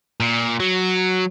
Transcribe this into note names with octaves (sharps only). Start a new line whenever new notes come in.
A#2
F#3